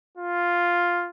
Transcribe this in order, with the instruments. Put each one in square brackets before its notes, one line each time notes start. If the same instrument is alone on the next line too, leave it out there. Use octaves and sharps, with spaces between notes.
[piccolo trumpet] F4